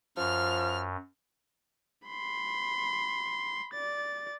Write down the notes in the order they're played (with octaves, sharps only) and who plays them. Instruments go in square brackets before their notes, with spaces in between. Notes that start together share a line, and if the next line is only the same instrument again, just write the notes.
[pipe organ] F#2 [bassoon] F3 [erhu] F6
[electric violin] B5 C6
D5 A6